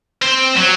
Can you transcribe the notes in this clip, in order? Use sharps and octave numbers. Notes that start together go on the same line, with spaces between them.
C4
F#3